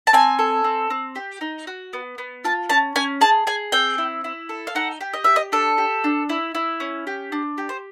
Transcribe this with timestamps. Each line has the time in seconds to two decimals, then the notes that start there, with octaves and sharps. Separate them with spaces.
0.07 A5
0.13 C4 G#5
0.39 A4
0.64 C4
0.90 C4
1.16 G4
1.41 D#4
1.67 F#4
1.93 B3
2.18 B3
2.44 F4 A5
2.70 C#4 A5
2.96 C#4 G#5
3.21 G#4 A5
3.47 G#4 G#5
3.72 C4 G5
3.98 E4
4.24 E4
4.49 A4
4.67 F5
4.75 D#4 F#5
5.01 G4
5.13 D#5
5.24 G4 E5
5.36 D#5
5.52 D4 A4
5.78 G4
6.04 D4
6.29 E4
6.55 E4
6.80 C#4
7.07 G4
7.32 D4
7.58 G4
7.69 C5